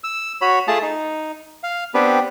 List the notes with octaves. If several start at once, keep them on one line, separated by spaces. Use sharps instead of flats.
E6
F#4 C#5 B5
A3 F4 G#4 A5
D#4
F5
B3 C4 D4 G4 B4